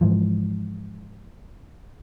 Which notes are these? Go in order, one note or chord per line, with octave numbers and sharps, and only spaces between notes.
G#2 E3 F3